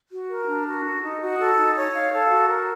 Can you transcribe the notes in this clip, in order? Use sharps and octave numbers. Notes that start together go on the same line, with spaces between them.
F#4
A#4
D4
F#4
A4
D#4
F#4
A4
D#4
C#5
F5
A4
F#4
A#4